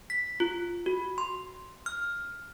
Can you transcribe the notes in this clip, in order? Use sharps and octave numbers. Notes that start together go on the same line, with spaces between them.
B6
F4
F#4
C6
F6